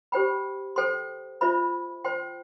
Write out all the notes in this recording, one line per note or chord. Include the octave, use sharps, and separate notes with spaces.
G4 C5 G5 B5
A4 C5 G5 C6
F4 C5 E5 B5
C5 G5 C6